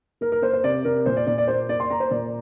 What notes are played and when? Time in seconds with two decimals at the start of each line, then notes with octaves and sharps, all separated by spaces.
0.21 A#3 A#4
0.32 A#4
0.42 A#3 C5
0.53 C5
0.63 C3 D5
0.85 C3 A#4
1.06 A#2 C5
1.17 D5
1.27 A#2 D5
1.38 D5
1.47 A#3 C5
1.69 A#3 D5
1.80 C6
1.90 A#3 A#5
2.00 C5
2.11 A#2 D5